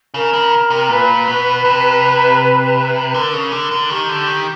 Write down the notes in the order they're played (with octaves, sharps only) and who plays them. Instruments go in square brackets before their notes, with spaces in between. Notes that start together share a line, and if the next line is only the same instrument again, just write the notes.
[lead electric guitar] C#3 [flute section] A#4
[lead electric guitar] C#3
C3
[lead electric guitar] A#2 [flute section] B4
[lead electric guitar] B2
C3
[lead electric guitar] D3 [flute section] A#4
[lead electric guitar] C#3
D3
D3
[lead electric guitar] D#3 [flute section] G4
[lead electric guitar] D3
D#3